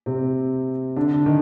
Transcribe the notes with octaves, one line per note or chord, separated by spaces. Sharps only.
C3 C4
D3 D4
D#3 D#4